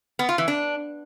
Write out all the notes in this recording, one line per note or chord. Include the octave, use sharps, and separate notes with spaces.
B3
F4
E3
D4